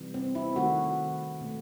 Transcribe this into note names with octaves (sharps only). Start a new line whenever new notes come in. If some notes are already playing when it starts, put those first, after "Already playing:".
Already playing: C3 E3 G3
C4
E4
D#3 A3 F#4
B2 A3